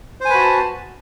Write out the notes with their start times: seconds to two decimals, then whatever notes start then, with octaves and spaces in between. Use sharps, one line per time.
0.20 C5
0.25 G#5
0.30 B4
0.34 F#4
0.39 A5